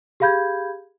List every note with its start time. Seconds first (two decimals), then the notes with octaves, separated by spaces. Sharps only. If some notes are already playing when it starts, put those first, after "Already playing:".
0.20 G4 G#4 F5 B5 G6 G#6